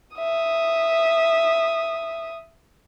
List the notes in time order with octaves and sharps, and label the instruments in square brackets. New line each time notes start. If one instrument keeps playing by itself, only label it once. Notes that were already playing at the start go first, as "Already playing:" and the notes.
[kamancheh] E5 D#6